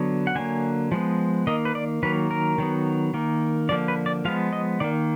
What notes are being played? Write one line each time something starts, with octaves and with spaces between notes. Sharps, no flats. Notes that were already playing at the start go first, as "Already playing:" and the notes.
Already playing: D3 F#3 B3
F#5
D3 F#3 A#3 G#5
F3 G#3 B3
D#3 A#3 D#5
B4
D5
D#3 F#3 A#3 B4
A#4
D#3 F#3 B3
D#3 A#3
D3 F3 A#3 D5
B4
D5
F3 G#3 B3 F5
D#5
D#3 A#3 D5